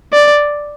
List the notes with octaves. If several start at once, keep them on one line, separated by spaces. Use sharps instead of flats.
D5